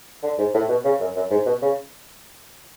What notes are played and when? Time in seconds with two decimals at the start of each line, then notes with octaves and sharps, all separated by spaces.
0.23 D3
0.39 G#2
0.54 A2
0.69 B2
0.85 C#3
1.00 F#2
1.16 F#2
1.31 G#2
1.46 B2
1.62 C#3